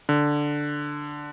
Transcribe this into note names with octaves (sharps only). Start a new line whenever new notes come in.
D3